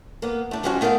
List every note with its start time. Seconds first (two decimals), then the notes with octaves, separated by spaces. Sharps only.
0.22 A#3 B3
0.51 A3 D4
0.63 F3 G3 G#3 C#4 D4 F#4
0.81 A3 B3 A#4 E5 F5